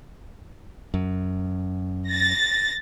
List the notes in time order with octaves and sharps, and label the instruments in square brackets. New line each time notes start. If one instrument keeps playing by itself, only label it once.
[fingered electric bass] F#2
[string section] A6 A#6